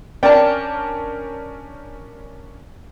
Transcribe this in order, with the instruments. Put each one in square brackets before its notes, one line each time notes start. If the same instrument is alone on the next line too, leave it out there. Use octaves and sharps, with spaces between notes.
[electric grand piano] C#4 D4 A#4 [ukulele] D5 [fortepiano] G5 A5